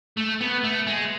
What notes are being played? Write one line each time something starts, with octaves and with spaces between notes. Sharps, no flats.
A3
B3
A3
G#3